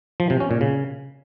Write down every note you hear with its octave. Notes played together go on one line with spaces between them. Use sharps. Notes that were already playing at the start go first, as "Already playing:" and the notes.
F3
C3
C#4
A#2
C#3